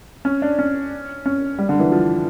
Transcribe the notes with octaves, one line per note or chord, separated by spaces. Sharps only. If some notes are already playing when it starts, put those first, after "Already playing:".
C#4
D4
C#4
C#4
G3
D3
E3
F3